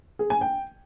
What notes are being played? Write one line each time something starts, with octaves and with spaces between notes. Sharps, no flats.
G#4
G#5
G5